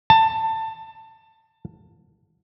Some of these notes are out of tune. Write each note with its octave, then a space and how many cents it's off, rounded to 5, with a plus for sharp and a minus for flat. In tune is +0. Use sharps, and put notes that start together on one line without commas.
A5 +20